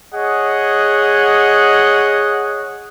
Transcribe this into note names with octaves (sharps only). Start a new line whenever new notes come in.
G#4 C#5 D#5 F#5